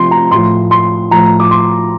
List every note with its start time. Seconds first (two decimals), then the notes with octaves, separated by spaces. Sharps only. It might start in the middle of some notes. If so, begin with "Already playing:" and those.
Already playing: C3 F3 C6
0.11 A#5
0.31 A2 F3 C6
0.71 C6
1.11 A2 F3 A#5
1.40 D6
1.51 C6